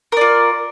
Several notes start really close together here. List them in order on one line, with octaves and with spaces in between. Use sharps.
A#4 D5 F4